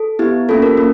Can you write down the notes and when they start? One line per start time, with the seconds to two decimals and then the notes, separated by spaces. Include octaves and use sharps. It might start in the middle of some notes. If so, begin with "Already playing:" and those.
Already playing: A4
0.19 B3 E4 G4
0.49 A#3 C#4 F4 A4
0.62 A#4
0.77 A#3 C#4